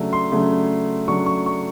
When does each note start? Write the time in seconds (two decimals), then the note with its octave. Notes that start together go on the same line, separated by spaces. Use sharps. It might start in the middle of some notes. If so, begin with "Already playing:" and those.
Already playing: C#3 F#3 A3 D4
0.13 C6
0.32 C#3 F#3 A3 D4
1.08 C#3 F#3 A3 D4 C#6
1.26 C#6
1.46 C#6